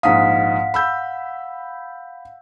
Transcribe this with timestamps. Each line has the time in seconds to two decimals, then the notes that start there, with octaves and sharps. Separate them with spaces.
0.03 A#1 G#2 F5 F#5 D#6 B6
0.74 B5 E6 G6